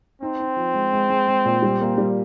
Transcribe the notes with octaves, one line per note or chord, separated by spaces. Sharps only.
C4 D#4
D#4
F3
G#3
G#3
G#3
G#3
A#2
G3
A#3
G3